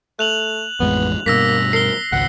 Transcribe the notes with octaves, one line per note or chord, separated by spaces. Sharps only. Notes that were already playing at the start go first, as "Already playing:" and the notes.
A3 F#6 F7 F#7
A1 F2 G#3 B3
G2 B2 A#3 E6 A#6 B6
A#4 C7 G7
G#1 C#2 F#5